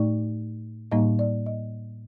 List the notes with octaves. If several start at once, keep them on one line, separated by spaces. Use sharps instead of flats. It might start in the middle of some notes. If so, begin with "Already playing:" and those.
Already playing: A2 A3 D#4 D5
A2 G3 A#3 D#4 D#5
D5
D#5